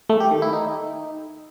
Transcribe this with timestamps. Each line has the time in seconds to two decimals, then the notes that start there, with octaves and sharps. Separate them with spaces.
0.10 A3
0.20 G4
0.31 D#3
0.42 E4
0.53 D#4